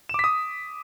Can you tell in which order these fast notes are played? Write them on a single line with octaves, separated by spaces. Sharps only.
E7 D6 B6 D#6